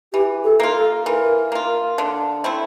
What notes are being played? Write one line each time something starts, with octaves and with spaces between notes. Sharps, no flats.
E3 G4
A4
A#3 F4
A4
E3 A#4
A#3 F4
D3
A3 C4 E4